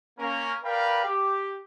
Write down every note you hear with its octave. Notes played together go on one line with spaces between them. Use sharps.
A#3 C#4 A#4
A#4 B4 D5 F5 G5 B5
G4